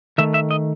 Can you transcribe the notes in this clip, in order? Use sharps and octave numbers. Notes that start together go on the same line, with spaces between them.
D#3 A3 E5
E5
D#5